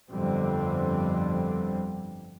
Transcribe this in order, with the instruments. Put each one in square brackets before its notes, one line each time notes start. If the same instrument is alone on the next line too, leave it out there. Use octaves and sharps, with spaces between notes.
[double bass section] G1 F2 D3 G3 C4